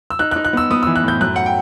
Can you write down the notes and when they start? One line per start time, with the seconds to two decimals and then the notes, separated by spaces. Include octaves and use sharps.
0.10 E6
0.19 D#4 F#6
0.31 F#6
0.36 D#4
0.45 F#6
0.53 B3 E6
0.71 B3 D#6
0.83 E3 E6
0.96 F#6
1.04 A2 G6
1.21 F#2 F#6
1.36 F#5
1.46 G5